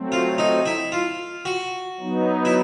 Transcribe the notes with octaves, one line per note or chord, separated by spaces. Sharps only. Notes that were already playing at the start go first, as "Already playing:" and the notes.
Already playing: F#3 A3 C4
F4
D#4
E4
F4
F#4
F#3 B3 D#4
E4